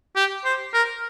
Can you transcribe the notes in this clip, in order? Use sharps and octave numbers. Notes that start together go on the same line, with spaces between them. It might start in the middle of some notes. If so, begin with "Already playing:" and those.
G4
C5
A#4